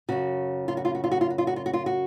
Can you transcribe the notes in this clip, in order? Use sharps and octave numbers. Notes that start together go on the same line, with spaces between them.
F#2 C#3 F#4
F4
F#4
F4
F#4
F4
F#4
F4
F#4
F4
F#4
F4
F#4
F4
F#4